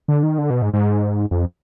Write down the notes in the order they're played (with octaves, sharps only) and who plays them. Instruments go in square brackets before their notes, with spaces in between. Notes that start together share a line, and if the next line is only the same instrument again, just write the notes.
[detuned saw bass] D3
D#3
D3
B2
G#2
G#2
F2